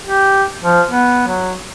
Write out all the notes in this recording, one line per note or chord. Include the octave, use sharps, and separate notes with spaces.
G4
F3
B3
F#3